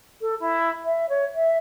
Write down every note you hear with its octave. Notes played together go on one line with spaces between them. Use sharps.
A4
E4
E5
C#5
E5